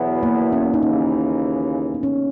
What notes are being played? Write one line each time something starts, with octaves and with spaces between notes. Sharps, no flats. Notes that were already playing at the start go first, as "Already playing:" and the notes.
Already playing: E2 B2 F#3 B3 E4
A#3
C#4
D#4
D#2 C#3 E3 C#4
B3
C#4